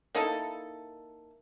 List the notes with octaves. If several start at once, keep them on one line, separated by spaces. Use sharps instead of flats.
A#3 D#4 E4 A4